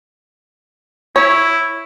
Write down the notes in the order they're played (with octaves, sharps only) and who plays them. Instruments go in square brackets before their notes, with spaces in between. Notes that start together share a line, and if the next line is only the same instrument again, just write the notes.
[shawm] E4 [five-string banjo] C#5